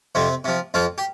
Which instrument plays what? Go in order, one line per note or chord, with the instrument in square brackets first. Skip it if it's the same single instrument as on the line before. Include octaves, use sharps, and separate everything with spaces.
[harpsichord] F2 C3 C4
C3 F3
F2 F3 F4
G4